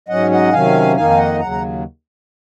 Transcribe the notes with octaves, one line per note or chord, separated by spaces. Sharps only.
G#2 F#3 C#4 D#5 F#5
D#5 F#5
C3 D#3 F#3 C#4 F5 G#5
F2 D#3 A#3 D#4 F5 G#5
F5
D#5 F#5
D#2 C#3 F#3 F#5 A#5
A#5